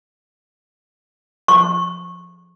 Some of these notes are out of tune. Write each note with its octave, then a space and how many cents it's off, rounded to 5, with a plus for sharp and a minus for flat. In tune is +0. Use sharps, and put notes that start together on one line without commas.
C#6 -20